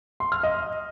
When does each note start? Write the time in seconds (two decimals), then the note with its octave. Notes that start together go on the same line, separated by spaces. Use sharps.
0.20 C6
0.32 F6
0.43 D#5